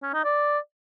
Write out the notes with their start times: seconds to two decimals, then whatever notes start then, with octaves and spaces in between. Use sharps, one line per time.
0.03 C#4
0.14 D#4
0.25 D5